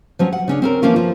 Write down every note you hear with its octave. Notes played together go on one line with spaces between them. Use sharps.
F3 F#3 C#4
F#5
C#3 C#4 D4
C4 C#4 A#4
E3 F3 A#3 C#4 F4
F3